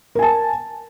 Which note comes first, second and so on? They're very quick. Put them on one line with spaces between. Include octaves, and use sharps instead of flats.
A#4 G#5 A5